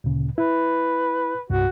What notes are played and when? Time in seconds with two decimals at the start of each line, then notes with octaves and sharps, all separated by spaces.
0.04 D2 A#2 C#3
0.38 E4 B4
1.50 C2 G2 F#4